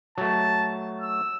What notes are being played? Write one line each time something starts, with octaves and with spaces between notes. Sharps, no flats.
F#3 A3 A5
E6